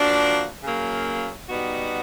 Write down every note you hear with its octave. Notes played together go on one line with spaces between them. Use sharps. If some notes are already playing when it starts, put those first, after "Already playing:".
Already playing: F3 A#3 D4 F#4
C#3 F#3 A#3
B2 G3 B3 D#4 F#4